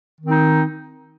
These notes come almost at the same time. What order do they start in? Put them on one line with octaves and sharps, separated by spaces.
D#3 C4 D#4